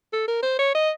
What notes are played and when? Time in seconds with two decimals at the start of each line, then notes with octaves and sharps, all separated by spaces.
0.13 A4
0.28 A#4
0.43 C5
0.59 C#5
0.75 D#5